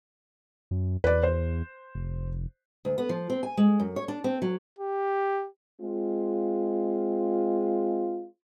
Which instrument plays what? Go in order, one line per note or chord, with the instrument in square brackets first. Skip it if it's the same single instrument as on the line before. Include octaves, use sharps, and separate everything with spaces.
[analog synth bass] F#2
[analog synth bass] E2 [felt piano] B4 D5
[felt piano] C5
[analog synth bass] F1
[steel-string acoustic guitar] D2
B3
F3
C4
G#5
G#3
F#2
C#5
D4
C4
F#3
[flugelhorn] G4
[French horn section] G#3 C4 F4